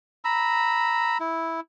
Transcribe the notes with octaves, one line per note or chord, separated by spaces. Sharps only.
A#5 B5 E6
E4